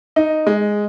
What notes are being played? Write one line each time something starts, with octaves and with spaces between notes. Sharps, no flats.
D#4
G#3